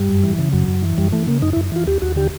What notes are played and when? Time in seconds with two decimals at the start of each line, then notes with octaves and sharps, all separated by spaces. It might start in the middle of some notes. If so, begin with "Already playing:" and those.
Already playing: G2 G3
0.09 F#2
0.24 E3
0.39 C#3
0.53 F#2 F#3
0.68 F#2
0.82 E3
0.98 F#2 G3
1.12 E3 A3
1.27 C#3 A#3
1.42 F#2 D#4
1.53 E4
1.57 F#2
1.72 E3 F4
1.87 D#2 G4
2.02 D#2 F#4
2.16 D3 G4